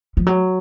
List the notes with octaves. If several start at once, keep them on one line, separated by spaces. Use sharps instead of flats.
F3
F#3